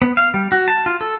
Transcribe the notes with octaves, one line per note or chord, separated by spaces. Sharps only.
B3
F5
G3
F#4
A5
F4
A4